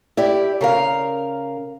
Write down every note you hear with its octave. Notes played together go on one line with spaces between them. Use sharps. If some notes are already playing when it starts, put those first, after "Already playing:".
E4 G4 D5
C#3 A#4 F5